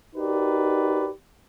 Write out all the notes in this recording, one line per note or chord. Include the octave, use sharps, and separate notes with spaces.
D#4 F#4 G4 A#4 B4 D5